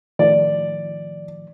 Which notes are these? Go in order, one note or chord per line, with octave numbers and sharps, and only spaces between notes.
A2 D#3 F3 D5